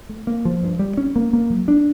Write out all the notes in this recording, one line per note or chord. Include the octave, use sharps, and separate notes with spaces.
A3
A#3
F3
G2
G3
C#4
A#3
A#3
F#3
D4